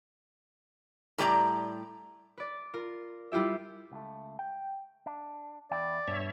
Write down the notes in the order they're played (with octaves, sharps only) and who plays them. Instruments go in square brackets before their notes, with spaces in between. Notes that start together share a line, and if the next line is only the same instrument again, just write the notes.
[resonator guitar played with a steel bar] A2 G3 G4 D5 A5 A#5
[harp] B4 D5
F4 A#4
G3 E4 F4 G4 E5
[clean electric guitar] C#2 A3
G5
D4
[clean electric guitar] E2 E4 G5 [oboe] D5
[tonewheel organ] G2 C#5 E5 [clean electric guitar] B2